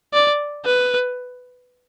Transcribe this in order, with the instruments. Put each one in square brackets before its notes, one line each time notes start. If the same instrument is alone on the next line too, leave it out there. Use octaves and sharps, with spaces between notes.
[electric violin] D5
B4